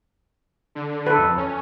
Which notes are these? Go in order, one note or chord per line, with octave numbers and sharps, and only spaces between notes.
D3
A4 B4
F2
C#4